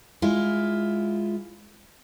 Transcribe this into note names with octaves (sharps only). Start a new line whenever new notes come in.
G#3 E4 F4